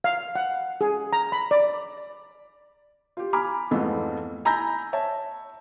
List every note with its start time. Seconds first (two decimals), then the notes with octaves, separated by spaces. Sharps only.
0.04 F5
0.35 F#5
0.81 G#4
1.13 A#5
1.32 B5
1.51 D5
3.17 F4 G4
3.33 G#5 A#5 B5 D6 F6
3.71 F2 G#2 E3 A3 B3 F4
4.45 G#5 A#5 B5 E6 G6 A#6
4.93 C#5 E5 A5